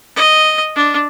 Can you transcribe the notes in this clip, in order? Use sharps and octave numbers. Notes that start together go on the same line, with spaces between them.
D#5
D4